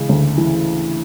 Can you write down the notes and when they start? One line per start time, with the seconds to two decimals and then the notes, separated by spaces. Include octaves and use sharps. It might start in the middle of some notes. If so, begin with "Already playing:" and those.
Already playing: C#3 E3 G#3
0.09 D2
0.38 E3